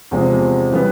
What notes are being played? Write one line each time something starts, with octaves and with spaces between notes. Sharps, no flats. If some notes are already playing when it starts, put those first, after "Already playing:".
E2 C3 F3 G#3 C4
C#3 E3 G3 B3